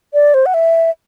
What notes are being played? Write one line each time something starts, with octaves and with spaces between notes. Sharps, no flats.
D5
C5
F#5
E5